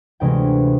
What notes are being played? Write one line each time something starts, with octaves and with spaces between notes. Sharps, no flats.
D2 C3 E3 G#3 G5